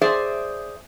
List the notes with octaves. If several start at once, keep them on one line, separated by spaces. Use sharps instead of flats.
G#4 C5 D5 E5